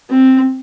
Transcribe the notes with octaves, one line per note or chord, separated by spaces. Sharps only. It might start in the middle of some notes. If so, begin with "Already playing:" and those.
C4